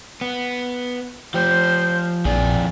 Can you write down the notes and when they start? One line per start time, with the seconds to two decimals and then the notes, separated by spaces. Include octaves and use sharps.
0.21 B3
1.34 F3 G4 C5
2.25 A#1 F2 G#4 D5